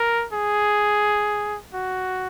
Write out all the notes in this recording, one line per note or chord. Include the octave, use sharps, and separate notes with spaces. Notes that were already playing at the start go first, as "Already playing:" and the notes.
Already playing: A#4
G#4
F#4